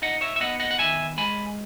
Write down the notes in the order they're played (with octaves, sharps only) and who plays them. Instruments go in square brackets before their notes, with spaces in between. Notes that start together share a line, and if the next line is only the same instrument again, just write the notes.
[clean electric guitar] D#4 D#5 F#5
C#5 E5
E5
B3 D#5 F#5
D#5 F#5
F#5
D#3 E5 G#5
G#3 G#5 B5